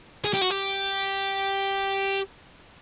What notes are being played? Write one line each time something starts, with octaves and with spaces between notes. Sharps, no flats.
G#4
G4
F#4
G4